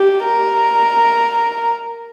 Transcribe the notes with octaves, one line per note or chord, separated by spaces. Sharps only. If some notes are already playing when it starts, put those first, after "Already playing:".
Already playing: G4
A#4